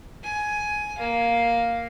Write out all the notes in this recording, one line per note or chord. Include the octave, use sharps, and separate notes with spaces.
G#5
A#3 F5